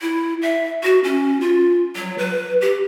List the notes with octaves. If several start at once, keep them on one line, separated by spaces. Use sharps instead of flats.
E4
E5
F#4
C#4
F4
F#3
B4
G4